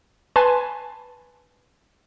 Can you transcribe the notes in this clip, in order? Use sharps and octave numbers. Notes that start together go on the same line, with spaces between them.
B4 G#5 A5 C6